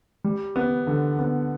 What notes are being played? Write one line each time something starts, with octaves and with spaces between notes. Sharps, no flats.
G3
B3
D3
B3